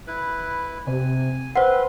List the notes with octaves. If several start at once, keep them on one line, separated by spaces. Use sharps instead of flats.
E4 B4
C3 G#5
C4 B4 C5 F#5 C6